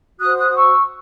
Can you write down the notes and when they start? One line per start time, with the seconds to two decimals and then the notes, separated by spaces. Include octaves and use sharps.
0.19 F#4 C5 D#6 F#6
0.37 D#6 F#6
0.49 D#6
0.55 C#6 E6